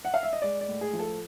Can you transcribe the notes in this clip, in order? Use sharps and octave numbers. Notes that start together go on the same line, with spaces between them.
F#5
F5
E5
D#5
G#3 D5
D5
A2
G#4
F3
A4